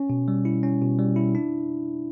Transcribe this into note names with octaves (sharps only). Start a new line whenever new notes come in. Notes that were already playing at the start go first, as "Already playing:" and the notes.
Already playing: C#4
B2
G3
E4
C#4
B2
G3
E4
D4